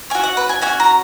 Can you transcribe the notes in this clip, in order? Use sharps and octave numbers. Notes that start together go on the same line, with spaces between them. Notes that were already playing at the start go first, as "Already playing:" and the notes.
C#4 F#4 G#5
F#5
B4
G#5
C#4 F#4 G#5
A#5